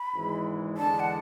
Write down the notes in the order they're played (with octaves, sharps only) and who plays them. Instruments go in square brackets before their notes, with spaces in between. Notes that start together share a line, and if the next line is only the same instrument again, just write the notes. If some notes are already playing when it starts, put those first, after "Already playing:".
Already playing: [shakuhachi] B5
[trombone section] G#1 G#2 E3 G#3
[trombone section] E2 D3 G#3 D4 [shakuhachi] A5
[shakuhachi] F#5